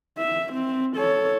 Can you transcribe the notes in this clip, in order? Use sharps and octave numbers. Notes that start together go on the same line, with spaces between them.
E5
C4
A4 C#5